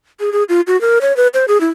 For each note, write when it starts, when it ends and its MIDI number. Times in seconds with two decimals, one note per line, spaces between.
0.20 0.32 68
0.32 0.44 68
0.49 0.61 65
0.67 0.79 66
0.81 0.99 70
1.01 1.15 73
1.17 1.27 71
1.34 1.45 72
1.48 1.60 68
1.61 1.68 64